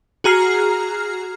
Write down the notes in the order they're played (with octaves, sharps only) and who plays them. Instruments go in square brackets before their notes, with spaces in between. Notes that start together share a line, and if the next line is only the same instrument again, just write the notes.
[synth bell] F#4 G#4 A#5 F6 C7